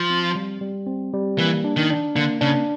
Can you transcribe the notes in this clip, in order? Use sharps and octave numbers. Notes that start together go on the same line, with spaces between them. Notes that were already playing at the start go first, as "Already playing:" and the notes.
Already playing: F3
C4
G3
G3
C4
G3
E3 A#3
D4
D#3
D4
D3 A#3
C#3 D4